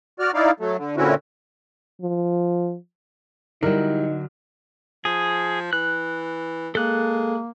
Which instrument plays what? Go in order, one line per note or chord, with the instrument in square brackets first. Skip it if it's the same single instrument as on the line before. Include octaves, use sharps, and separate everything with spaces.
[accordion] F#4 D5 F6
D#4 E4 D5 F5
F#3 A3
D3
A#2 D3 C4 C#4 E4 F#4
[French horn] F3
[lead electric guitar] D3 F#3 [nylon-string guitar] G3 E4 [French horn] D#4 [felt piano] A#4
[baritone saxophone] F3 [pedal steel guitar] G#4
[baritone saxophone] E3 [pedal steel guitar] F#6
[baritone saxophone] G#3 [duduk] A#3 [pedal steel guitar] A4 F#6